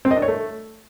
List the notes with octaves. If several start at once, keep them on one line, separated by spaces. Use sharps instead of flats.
C4
D#5
D4
C#5
A3